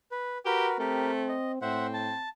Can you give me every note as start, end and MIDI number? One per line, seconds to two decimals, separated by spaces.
0.12 0.38 71
0.46 0.77 66
0.46 0.67 67
0.46 0.77 70
0.46 0.77 71
0.79 1.36 57
0.79 1.58 60
0.79 1.11 67
0.79 1.11 70
1.28 1.52 75
1.62 2.12 45
1.62 2.25 60
1.62 1.87 72
1.62 1.87 76
1.62 1.87 78
1.94 2.29 81